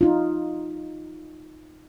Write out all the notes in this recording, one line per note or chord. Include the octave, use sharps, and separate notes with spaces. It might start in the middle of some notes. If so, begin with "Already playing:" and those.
D#4 F4